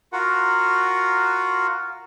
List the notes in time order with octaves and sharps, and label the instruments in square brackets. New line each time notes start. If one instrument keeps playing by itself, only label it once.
[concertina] F4 F#4 A#4 F#5